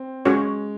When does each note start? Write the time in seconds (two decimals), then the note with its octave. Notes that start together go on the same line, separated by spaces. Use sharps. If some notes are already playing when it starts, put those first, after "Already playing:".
Already playing: C4
0.25 G#3 C#4 F#4 C#5